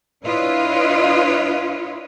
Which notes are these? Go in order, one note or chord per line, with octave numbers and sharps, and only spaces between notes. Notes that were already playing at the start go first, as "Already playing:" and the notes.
D4 E4 F4 B4 C#5 D#5